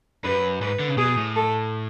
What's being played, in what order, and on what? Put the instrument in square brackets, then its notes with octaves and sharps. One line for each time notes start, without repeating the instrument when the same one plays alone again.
[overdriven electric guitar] F#2 [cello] B4
[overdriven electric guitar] G#2 [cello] B4
[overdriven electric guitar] D3
C#3
[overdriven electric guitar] B2 [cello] G#4
[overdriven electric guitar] A2
[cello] A4